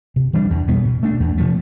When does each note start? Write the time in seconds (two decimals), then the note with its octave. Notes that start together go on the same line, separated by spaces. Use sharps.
0.16 C3
0.33 E3 G3 D4
0.50 E2
0.68 B2 G3 B3
0.85 B2
1.03 A3 D4
1.20 E2
1.38 C3 F3 A3